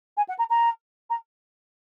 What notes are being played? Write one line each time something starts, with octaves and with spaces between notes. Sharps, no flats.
G#5
F#5
A#5
A#5
A#5